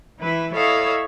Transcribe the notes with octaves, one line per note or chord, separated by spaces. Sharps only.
E3 E4 B4
E4 A4 C#5 D#5 F5 E6